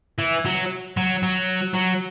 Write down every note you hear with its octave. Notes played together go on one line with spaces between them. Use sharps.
E3
F#3
F#3
F#3
F#3